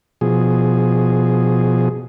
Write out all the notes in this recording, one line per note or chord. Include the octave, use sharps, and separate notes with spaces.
B2 F3 G#4